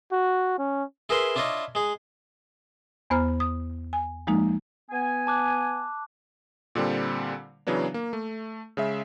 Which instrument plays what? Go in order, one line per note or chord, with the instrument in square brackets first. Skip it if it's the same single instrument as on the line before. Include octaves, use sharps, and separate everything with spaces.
[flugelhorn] F#4
C#4
[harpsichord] E4 G#4 A#4 B4 E5 C6
D4 E4 F4 C#5 D#5
G#3 G#4
[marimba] E2 B3 C5 A#5 F6
D#6
G#5
F3 G#3 A#3 D#4
[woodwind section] B3 G#5
[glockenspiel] A5 D6 F#6
[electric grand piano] A#2 D3 G3 C4
C#3 E3 F#3 B3 D4
A#3
A3
C#3 G#3 E5